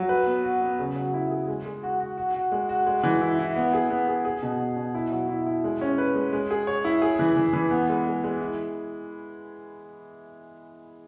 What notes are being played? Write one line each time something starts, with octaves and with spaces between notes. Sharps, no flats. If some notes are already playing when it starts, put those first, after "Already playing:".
Already playing: F#3
B4
B3
F#4
B3
C#3
F#3
E4
G#4
G#3
G#3
F#4
F#4
F#4
F#4
G#3
F#4
G#3
E3
E4
E4
B3
G#4
B3
G#4
G#4
B2
B2
B2
E4
F#3
E4
E4
G#3
C#4
B4
G#3
G#3
G#4
C#5
E4
G#4
E3
E3
E3
B3
G#3
G#3
G#3
E4